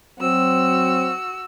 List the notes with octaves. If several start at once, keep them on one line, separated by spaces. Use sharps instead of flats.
F#3 C4 F#4 E6